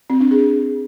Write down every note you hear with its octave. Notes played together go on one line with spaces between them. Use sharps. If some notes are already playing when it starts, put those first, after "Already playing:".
C4
D4
G#4